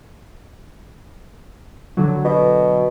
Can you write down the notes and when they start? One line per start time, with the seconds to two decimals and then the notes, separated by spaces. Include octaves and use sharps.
1.97 D3 F#3
2.25 B2